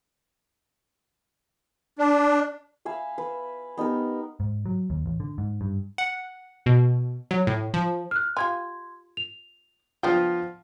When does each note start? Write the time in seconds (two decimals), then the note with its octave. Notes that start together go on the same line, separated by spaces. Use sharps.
1.99 D4
2.85 E5 F5 G#5 B5
3.18 B4
3.77 B3 D#4 G4 A#4
4.40 G#2
4.66 F#3
4.90 D#2
5.06 A1
5.20 D3
5.38 G#2
5.61 G2
5.98 F#5
6.66 B2
7.31 F#3
7.47 A2
7.74 F3
8.11 F6 F#6
8.37 F4 G4 G#5 C6 G#6
9.17 F7
10.03 F3 B3 D4 F4 G5